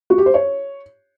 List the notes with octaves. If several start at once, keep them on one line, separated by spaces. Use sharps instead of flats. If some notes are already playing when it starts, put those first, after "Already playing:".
F#4
G4
C5
C#5